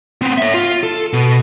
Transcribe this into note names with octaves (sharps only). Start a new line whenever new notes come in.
B3 C4
C#5 E5
F4
A4
B2